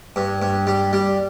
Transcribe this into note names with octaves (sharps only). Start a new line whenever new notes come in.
G2
G2
G3
G3